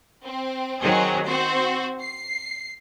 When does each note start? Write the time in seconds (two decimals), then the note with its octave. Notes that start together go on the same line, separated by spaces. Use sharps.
0.25 C4
0.80 D#3 F#3 C4 G#4
1.26 C4 F#4 C5
2.01 C7